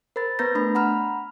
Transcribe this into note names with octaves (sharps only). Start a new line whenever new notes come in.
A#4 C5 B5 A6
B3 B4 A#5 G6 A#6
A3 D4 B5
F#5 A#5 B5 F6